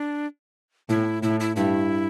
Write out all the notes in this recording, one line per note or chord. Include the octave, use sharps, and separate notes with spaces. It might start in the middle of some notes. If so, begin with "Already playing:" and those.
Already playing: D4
A2 E4
A2 E4
E4
G2 E4